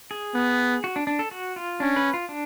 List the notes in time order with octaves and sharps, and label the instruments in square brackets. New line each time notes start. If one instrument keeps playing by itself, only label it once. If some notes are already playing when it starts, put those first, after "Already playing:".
[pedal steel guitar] G#4
[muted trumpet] B3
[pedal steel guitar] F#4
D4
D4
A4
F#4
F4
[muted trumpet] C#4 [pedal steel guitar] D4
[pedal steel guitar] B4
F4
D4